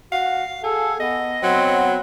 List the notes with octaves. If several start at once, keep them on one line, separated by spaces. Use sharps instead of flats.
F#4 F5
G#4 A4
B3 D#5
F#3 B3 C4